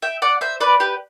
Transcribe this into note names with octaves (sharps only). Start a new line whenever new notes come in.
E5 G5
D5 F#5
C5 E5
B4 D5
G4 B4